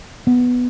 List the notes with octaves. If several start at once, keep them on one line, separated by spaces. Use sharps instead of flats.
B3